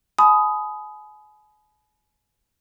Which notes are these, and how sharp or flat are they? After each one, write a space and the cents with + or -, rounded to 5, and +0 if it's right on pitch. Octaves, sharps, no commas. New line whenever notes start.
G#5 +35 B5 +15 D#6 +5